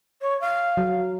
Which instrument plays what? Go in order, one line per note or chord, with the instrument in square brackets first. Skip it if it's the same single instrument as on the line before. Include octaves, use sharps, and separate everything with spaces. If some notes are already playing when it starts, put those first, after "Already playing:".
[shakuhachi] C#5
F5
[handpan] F#3